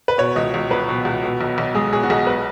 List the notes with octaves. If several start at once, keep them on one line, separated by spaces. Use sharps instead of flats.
B4
B2 C#5
C#2 D#5
C#2
F#3 B4
B2
C#2
B2
B1
B1
G#3 G#4
B2 G#4
F#4
B1 G#4
B4